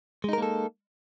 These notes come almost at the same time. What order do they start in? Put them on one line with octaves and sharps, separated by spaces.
G#3 D#4 A#4 A#3 A4